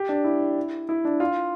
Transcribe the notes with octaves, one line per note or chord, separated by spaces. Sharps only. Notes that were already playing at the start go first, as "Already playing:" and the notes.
Already playing: G4
D4
E4
E4
D4
F4